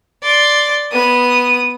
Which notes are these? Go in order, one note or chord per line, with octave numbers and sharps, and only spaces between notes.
D5 C6
B3 D#6